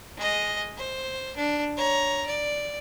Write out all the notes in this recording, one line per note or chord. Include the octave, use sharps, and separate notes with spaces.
G#3 D#5
C5
D4
C#5 A#5
D5